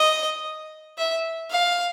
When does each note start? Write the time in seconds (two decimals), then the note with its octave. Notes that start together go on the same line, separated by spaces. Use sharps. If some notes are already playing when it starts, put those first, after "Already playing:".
Already playing: D#5
0.98 E5
1.51 F5